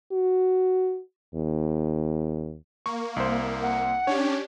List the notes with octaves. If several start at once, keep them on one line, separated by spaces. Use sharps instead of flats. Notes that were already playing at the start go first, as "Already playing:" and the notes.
F#4
D#2
A#3 C#6
C2 C5
F#5
C#4 D4 G4 C#5